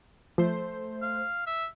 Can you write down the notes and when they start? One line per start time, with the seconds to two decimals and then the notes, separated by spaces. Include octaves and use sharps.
0.38 F3 A3 C5
1.02 F5
1.47 E5